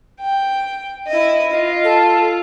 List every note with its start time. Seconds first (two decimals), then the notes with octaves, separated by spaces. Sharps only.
0.20 G5
1.07 E4 D#5
1.52 F4 D#5
1.84 A4